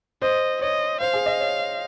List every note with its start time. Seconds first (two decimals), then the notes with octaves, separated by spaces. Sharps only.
0.22 C5 D#5
0.61 C#5 D#5
1.01 C5 F5
1.14 G#4
1.26 D#5
1.40 C#5